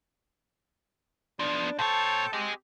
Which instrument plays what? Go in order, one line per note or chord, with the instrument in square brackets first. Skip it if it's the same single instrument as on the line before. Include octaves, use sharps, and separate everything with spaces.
[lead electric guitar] F3 B3 [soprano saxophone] D4
[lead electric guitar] A#2 C#5 [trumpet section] A4 C5 G5 [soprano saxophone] A5
[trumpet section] C4 G4 [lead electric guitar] G#4 D#5